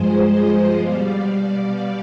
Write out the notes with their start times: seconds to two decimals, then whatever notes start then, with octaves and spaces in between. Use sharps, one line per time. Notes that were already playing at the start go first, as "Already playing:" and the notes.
Already playing: G2 F3 G#3 G#4 C5
0.23 C5 D#5
0.76 B2 G3 D5 F5